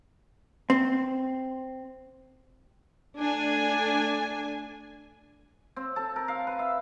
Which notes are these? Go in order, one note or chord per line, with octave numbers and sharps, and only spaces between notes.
C4
A3 D4 G#5
C4
A4
A#4
F5
B4
E5